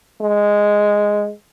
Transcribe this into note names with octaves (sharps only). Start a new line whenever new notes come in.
G#3